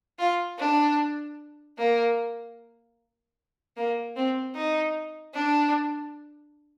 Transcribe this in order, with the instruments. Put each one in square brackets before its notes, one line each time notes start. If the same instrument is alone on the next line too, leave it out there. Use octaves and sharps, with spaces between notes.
[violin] F4
D4
A#3
A#3
C4
D#4
D4